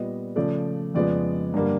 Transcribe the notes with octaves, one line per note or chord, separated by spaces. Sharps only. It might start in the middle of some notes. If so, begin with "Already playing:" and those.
Already playing: A#2 G3 B3 D#5
C#3 F3 A3 D5
F2 C#3 F3 G#3 B3 D5
G2 D3 G3 A#3